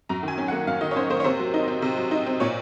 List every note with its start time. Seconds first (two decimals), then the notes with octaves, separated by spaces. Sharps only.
0.09 F#2 A#5
0.23 D#3 G#5
0.38 C#4
0.48 F#5
0.52 A#3
0.67 F#2 F5
0.81 D#3 D#5
0.91 C#5
0.96 C#4 C5
1.10 A#3 C5
1.20 C#5
1.24 C3 C5
1.39 F#3
1.54 D#4
1.68 C4
1.82 C3
1.97 F#3
2.11 D#4
2.26 C4
2.40 A#2 C#5